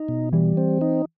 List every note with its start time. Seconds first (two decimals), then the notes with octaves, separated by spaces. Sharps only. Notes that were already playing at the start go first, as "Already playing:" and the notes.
Already playing: D#4
0.08 B2
0.33 E3 G3
0.57 C4
0.81 D#4